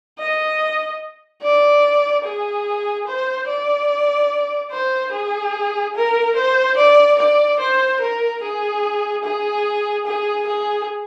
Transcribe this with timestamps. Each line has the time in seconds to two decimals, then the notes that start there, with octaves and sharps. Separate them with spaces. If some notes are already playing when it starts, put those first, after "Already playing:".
0.19 D#5
1.43 D5
2.24 G#4
3.07 C5
3.48 D5
4.72 C5
5.13 G#4
5.95 A#4
6.36 C5
6.77 D5
7.18 D5
7.59 C5
8.00 A#4
8.42 G#4
9.23 G#4
10.06 G#4
10.47 G#4